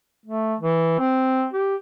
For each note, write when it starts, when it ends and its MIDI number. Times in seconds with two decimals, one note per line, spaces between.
0.26 0.55 57
0.60 0.94 52
0.99 1.47 60
1.53 1.75 67